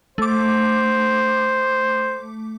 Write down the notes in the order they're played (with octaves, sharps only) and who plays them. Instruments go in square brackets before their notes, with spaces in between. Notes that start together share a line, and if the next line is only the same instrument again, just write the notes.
[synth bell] A3 D6 [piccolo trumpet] C5